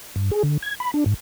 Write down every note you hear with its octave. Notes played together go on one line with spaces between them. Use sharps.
G2
G#4
D3
G#6
B5
D4
G#2